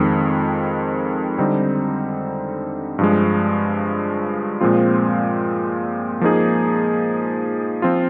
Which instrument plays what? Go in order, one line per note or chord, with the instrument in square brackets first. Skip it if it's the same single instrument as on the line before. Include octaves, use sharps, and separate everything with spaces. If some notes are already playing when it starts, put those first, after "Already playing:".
Already playing: [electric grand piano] F2 D#3 G#3 C4
D3 G3 C4 D#4
G2 F3 G#3
A#2 F3 G#3 C4 F4
F3 A#3 D#4 G#4
F3 C4 F4